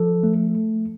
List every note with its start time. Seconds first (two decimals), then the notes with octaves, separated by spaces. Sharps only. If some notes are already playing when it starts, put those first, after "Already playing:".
Already playing: F3 A4
0.23 A3